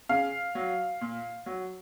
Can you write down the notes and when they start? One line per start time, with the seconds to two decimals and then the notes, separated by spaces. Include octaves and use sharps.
0.09 C#3 F5
0.55 F#3
1.01 A#2
1.46 F#3